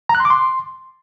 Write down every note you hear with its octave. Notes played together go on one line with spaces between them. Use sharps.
A#5
F#6
C6
D6
C6